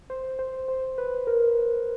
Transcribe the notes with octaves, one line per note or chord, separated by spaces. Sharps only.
C5
C5
C5
B4
A#4